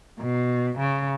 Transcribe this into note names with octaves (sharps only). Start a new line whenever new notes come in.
B2
C#3